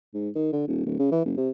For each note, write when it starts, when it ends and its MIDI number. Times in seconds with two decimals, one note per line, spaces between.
0.14 0.29 44
0.36 0.51 51
0.53 0.63 50
0.67 0.84 27
0.86 0.95 26
0.99 1.08 49
1.12 1.20 52
1.25 1.34 30
1.37 1.50 48